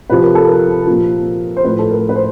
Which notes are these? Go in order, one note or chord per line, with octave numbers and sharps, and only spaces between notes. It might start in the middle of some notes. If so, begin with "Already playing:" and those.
C3 F3 B4
A#4
A4
A#4
A#2 F3
C5
A2 F3 B4
A4
A#4
B4
C5